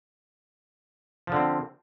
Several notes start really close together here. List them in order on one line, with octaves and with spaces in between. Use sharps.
F3 D3 C4